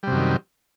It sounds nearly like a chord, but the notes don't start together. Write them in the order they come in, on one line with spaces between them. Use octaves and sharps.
G3 C3 F#2 D#3